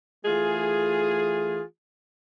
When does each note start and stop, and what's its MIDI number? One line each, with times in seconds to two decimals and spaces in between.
0.25 1.62 52
0.25 1.62 57
0.25 1.62 65
0.25 1.62 68